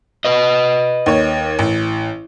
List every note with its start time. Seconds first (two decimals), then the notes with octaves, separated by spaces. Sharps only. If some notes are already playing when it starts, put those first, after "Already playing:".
0.25 B4 D#5
1.06 D#2 C#5
1.59 A1